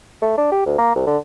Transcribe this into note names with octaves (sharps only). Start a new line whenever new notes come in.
A3
D4
G4
D2
A#3
C2
D3